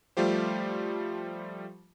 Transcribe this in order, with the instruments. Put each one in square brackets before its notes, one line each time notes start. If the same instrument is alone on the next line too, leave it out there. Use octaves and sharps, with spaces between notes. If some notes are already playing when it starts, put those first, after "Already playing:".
[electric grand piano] F3 G3 A3 F4 G4 C5